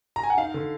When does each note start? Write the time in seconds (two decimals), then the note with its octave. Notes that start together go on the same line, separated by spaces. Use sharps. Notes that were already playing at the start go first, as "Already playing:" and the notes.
0.16 A#5
0.23 G#5
0.30 F#5
0.37 D#4 F5
0.54 D3